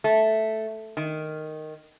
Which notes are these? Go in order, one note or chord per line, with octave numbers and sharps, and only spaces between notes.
A3
D#3